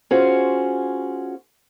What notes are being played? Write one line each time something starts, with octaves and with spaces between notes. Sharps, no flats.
C#4 F4 F#4 G#4 C5